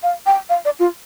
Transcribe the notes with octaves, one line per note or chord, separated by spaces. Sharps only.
F5
G5
F5
D5
F4